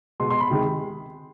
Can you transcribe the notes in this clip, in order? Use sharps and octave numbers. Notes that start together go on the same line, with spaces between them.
B2 G#3 C6
C6
B5
C3 D#3 G#3